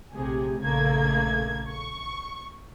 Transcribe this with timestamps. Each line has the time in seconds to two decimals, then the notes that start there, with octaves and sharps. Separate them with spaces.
0.13 A#1 A2 C3 G4 G#4
0.58 A#1 C#3 A3 A#3 G#6
1.68 C#6